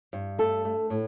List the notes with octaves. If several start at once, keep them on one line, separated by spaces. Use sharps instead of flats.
G2
A3 A4
A3
A2